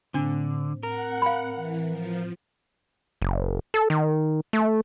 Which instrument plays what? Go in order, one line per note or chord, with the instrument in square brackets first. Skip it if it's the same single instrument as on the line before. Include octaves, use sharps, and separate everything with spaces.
[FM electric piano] A2 C4 [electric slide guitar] D3 [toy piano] D4 D6
[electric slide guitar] A#4 [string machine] F#5
[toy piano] F5 B5
[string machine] E3
F3
[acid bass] F#1
A4
D#3
A3